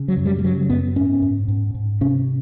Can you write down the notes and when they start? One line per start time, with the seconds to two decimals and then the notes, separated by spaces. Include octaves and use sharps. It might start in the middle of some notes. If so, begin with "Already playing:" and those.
Already playing: C#3
0.08 F#3
0.17 F#2
0.26 G3
0.39 G3
0.44 C#3 F#3
0.70 F#2 B3
0.96 G#2 C#4
1.22 G#2
1.48 G#2
1.75 G#2
2.01 C3 C#4